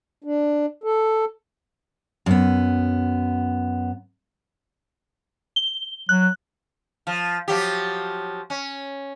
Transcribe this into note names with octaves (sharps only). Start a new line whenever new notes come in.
D4
A4
F#2 B3
G7
F#3 F#6
F3
F3 F#3 G4
C#4